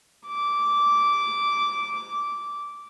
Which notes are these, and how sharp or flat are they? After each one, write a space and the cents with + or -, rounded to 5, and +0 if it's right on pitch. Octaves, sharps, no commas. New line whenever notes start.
D6 -10